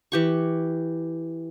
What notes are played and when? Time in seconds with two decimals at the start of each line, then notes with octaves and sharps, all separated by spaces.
0.12 E3 G4 C#6